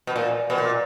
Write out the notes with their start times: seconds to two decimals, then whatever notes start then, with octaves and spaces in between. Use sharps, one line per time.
0.07 B2
0.16 A#2
0.50 B2
0.58 A#2